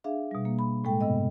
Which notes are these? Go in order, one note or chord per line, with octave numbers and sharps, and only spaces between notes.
D4 G#4 E5 F5
B2 G3
A#3
B5
A2 G#3 A4 G5
G2 C3 B3 D#5